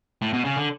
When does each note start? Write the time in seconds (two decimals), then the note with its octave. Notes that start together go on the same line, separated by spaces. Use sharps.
0.22 A2
0.33 B2
0.45 C#3
0.57 D3